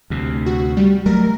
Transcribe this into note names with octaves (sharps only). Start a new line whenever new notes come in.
D2 C3
F#4
G3
F#3 A3 A#4